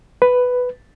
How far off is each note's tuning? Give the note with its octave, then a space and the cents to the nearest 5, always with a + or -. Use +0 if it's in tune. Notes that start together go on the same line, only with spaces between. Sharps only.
B4 +5